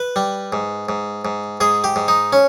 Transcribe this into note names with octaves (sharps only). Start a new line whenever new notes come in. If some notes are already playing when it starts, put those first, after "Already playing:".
Already playing: B4
G3
G#2
G#2
G#2
G#2 G#4
G4
G#2
D#4
C#4